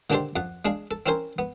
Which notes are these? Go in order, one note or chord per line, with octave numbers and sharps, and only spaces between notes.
D3 D#3 D4 G4 A4 C5
F2 F#5
G#3 D4 G#4 F5
A4
C4 C#4 E4 A#4 C5 G#5
B3